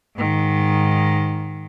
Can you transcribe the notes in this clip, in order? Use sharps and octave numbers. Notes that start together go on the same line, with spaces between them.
G#2 D#3